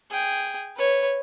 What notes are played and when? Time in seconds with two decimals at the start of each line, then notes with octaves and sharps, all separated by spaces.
0.11 G#4 G5
0.77 B4 C#5